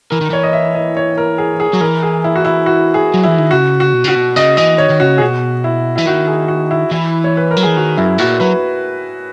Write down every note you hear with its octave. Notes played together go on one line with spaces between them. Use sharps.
E3 A#4
D#3
E3 C#5
D#5
E5
D#5
C#5
A#4
G#4
G#4
F#3
E3 A#4
G#4
E4
F#4
E4
F#4
G#4
F#3
E3 E4
D#3
C#3 F#4
F#4
B2
C#3 F#4
B2
C#3 D#5
E3 D#5
D#3 C#5
D#3
C#3 F#4
G#4
B2 F#4
E4
E3 E4
D#3 F#4
G#4
F#4
E4
E3 E4
C#5
B4
A#4
F#3
E3 G#4
D#3 F#4
F#2 E4
A#2 F#4
F#3 B4